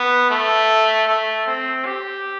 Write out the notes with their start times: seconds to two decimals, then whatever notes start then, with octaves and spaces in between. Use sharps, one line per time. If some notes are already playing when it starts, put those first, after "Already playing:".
Already playing: B3
0.30 A3
1.07 A3
1.47 C4
1.86 G4